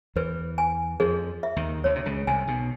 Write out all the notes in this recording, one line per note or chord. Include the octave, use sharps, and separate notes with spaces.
E2 E3 B4
G#5
F2 F3 G#4
E5
D#2 D#3
D2 D3 C#5
C3
C#2 C#3
C2 C3 G#5
B1 B2